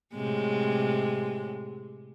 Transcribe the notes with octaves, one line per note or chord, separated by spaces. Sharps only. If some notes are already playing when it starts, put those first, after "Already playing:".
A2 C3 G#3